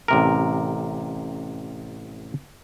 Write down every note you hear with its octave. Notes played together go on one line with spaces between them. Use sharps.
A1 C3 A#4